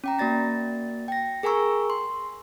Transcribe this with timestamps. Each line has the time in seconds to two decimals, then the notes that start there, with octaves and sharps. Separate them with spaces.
0.04 C#4 G5 A#5
0.19 A#3 F#4 D5 A6 A#6
1.08 G5 A#6
1.43 G#4 A#4 G#5 A#5 C#6 E6
1.90 C6